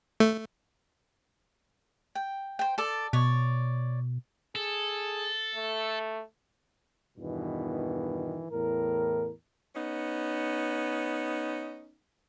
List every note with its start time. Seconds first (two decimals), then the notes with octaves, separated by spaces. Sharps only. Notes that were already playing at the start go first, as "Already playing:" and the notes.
0.20 A3
2.15 G5
2.59 C5 G5
2.78 A4 D5
3.13 B2 C#5 D5
4.55 G#4 A4
5.55 A3
7.17 E2 G2 B2 D#3 E3
8.49 E2 A2 A#4
9.76 B3 C#4 D#4